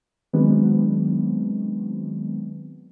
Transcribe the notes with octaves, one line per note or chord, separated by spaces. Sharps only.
D#3 F#3 G#3 B3 C4 D4